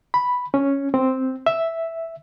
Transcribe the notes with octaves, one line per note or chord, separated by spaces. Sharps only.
B5
C#4
C4
E5